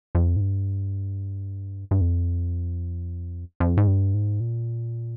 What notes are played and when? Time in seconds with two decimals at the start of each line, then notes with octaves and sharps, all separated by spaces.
0.15 F2
0.36 G#2
0.41 G2
1.91 G2
2.01 F2
3.60 F2
3.77 G#2
3.87 G2
4.14 G#2
4.40 A#2